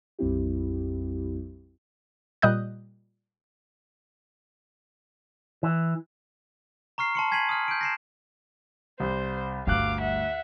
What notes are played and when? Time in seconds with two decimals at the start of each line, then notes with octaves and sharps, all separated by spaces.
0.19 A#1 F2 G3 C4 E4 G4
2.42 A#2 G3 D#5 D#6 F#6 G6
5.63 E3
6.98 A#5 C#6 F6 C7
7.15 A5 C6 C#7
7.31 G#5 G#6 B6 C7 D#7 F#7
7.49 D#6 F6
7.68 G6 D7
7.81 A#6 C7 E7
9.00 C2 C5
9.67 G1 D2 G3 F5 D6 F#6
10.00 E5 F#5